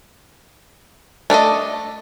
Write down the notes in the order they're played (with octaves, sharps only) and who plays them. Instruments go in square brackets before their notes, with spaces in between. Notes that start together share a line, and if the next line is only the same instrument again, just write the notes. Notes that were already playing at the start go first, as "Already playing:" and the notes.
[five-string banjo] A3 D4 A4 D#5